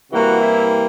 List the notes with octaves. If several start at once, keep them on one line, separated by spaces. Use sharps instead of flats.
C3 E3 G3 A#3 F#4
E4